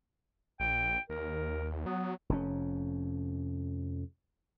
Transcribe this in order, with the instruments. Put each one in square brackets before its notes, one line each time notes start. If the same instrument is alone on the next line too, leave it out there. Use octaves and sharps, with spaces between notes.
[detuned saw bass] A#1 [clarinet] G5
[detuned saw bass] D#2 [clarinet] A#4
[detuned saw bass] F#3 [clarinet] B3
[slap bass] F1 F2 C#4